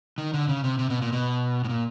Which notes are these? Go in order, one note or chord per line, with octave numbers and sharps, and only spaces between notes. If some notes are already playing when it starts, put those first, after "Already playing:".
D#3
D3
C#3
C3
C3
B2
A#2
B2
A2
A#2